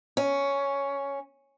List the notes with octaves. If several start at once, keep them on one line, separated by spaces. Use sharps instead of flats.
C#4